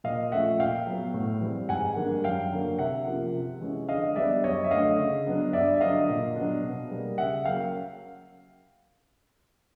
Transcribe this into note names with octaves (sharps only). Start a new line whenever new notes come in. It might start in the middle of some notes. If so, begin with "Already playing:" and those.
A#2 D#5 F5
F3 A3 C#4 E5 F#5
A#2 F5 G5
F#3 B3
A2
E3 G3 C4
G#2 F#5 G#5
D#3 G3 A#3 D4
F#2 F5 G5
D3 F#3 A#3
C3 E5 F#5
F3 A#3 C#4
C3
E3 G#3 C#4
D3 D#5 F5
G3 B3 D4 D5 E5
F#2 C#5 D#5
E5
D3 F#3 A3 D#5 F5
C#3
F#3 B3 D4
G2 D5 E5
E5
D3 F#3 D#5 F5
A#2
F#3 B3 D4
B2
G3 A#3
C#3 E5 F#5
F#3 A#3 C#4 F5 G5